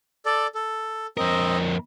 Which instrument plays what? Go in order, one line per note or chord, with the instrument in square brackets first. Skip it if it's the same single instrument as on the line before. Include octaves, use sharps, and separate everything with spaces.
[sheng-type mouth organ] A4 D5
A4
[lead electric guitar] F2 A#4 [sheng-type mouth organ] C4 D#5